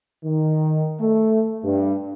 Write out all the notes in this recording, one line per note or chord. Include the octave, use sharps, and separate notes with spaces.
D#3
A3
G2